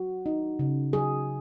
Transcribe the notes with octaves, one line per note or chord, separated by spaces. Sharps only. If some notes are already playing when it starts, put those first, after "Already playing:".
Already playing: F#3 F#4
D#4
C#3
F#3 G#4